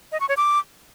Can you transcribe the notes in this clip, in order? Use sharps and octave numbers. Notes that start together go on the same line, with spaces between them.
D#5
C#6
C#5
D6